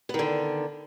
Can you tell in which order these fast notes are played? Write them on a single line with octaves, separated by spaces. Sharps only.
B3 D#3 D3